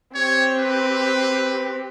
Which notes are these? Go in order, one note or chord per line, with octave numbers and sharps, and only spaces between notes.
C4 G4 C#5
B4